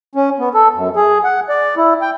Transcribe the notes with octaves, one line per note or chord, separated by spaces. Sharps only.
C#4
B3
A4
F#2
G#4
F#5
D5
E4
G5